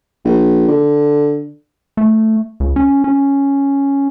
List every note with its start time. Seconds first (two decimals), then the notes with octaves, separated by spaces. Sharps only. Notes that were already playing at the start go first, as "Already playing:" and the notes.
0.25 A#1
0.68 D3
1.97 A3
2.60 C#2
2.76 C#4
3.04 C#4